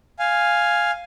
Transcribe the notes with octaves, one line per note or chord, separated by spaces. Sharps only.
F5 G#5